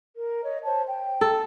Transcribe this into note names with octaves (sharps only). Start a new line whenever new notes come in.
A#4
C#5 D#5
C5 C#5 A5
G5
A4